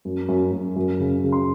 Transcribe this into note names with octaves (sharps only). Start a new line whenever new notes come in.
F#2
F#2
F#2
F#2
C#3
C#3
C6